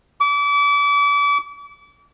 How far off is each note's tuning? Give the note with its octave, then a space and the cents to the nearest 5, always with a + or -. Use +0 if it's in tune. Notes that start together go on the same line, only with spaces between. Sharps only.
D6 -35